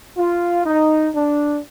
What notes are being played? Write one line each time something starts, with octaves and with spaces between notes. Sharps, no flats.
F4
D#4
D4